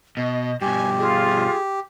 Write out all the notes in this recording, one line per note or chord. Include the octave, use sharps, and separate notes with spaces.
B2 D#5
G2 B2 G4 G#5
F4 G#4